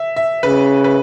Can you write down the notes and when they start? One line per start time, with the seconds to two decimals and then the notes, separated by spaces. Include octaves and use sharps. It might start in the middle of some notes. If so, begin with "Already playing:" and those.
Already playing: E5
0.16 E5
0.43 C#3 B4
0.84 B4